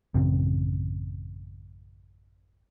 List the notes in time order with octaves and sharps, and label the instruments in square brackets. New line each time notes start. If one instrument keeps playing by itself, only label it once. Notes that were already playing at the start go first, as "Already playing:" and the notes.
[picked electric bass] A1 F#2 C#3 C4